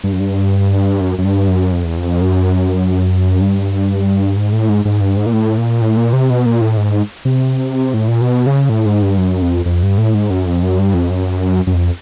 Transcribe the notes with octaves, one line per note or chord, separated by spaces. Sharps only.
G2
F#2
G2
F#2
F#2
G2
F#2
F2
E2
F2
F#2
G2
G#2
A2
G#2
G#2
G2
G#2
A#2
A2
A#2
A2
A#2
C3
B2
A#2
A2
G#2
C3
A2
A#2
B2
C#3
A2
G#2
G2
F#2
F2
F2
G2
A2
G#2
F#2
F2
F#2
G2
F2
F#2
F#2
F2